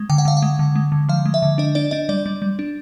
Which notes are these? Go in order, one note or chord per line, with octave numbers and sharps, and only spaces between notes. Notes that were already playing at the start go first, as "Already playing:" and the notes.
Already playing: G#3
D3 G5
F#5
D3 F5
F#5
G#3
D3
G#3
D3
F3 F5
G#3
E5
D3
D4 D#5
D4 D5
D4 D#5
G3 D5
G3
G3
D4